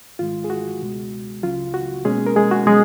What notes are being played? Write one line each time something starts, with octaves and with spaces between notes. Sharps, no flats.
G#2 D#3 G#3 F4
G#4
F#4
C#2 B2 G#3
C#2 C#3 F#3 F4
F#4
B2 G#3 A#3 C#4 G#4
A#4
G#3 G#4
F#4
B2 F#3 G#3 C#4 G#4